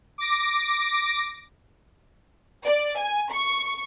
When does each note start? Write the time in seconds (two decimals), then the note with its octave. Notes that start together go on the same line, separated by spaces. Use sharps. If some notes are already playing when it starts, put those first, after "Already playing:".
0.18 D6 A#6
2.64 D5
2.98 G#5
3.31 C#6